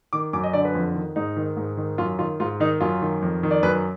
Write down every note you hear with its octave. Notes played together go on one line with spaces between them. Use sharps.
D#3 D6
F#2 D6
D#5
D3 D5
B4
F2
D#3
G#2 D#4
D#3
G#2
D#3
F#2 F4
D#3 F4
G#2 F4
D#3 D#4
F#2 F4
D#3
F2
D#3
D5
F#2 B4